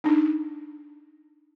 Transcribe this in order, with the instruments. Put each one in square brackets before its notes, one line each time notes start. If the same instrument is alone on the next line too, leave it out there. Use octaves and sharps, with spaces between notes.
[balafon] D4 D#4